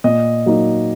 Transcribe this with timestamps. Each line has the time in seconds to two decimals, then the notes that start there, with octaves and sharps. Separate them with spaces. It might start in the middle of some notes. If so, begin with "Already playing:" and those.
0.04 A#2 D#5
0.46 F#3 A#3 D#4